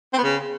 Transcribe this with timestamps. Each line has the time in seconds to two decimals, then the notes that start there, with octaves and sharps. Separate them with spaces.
0.13 C4
0.18 B3
0.24 C#3